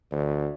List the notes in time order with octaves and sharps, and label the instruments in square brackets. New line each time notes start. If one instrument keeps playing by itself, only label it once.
[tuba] D2